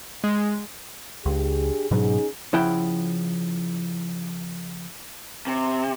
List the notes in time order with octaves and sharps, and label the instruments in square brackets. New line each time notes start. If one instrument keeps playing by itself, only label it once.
[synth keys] G#3
[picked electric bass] C#2 [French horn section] D4 G4 G#4
[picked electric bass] G#2 B2 F#3 [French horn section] C#4 D#4 G#4
[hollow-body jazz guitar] C#3 F3 E4 F#5 G5
[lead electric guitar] C3